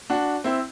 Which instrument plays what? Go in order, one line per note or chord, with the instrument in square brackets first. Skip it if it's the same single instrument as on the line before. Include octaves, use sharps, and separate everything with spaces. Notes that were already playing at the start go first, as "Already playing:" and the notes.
[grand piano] D4 F#4
C4 E4